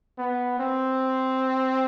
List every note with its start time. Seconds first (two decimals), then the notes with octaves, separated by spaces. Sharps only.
0.18 B3
0.59 C4